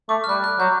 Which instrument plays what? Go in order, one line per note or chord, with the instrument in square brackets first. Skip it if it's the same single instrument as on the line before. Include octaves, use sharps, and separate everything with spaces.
[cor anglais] A3 [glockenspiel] D6
[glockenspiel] F6
[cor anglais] G3 [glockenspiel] F#6
[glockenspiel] F#6
[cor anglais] F#3 [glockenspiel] G6